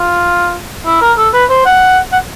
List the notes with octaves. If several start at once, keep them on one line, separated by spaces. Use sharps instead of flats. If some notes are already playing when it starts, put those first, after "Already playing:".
Already playing: F4
E4
A#4
A4
B4
C5
F#5
F#5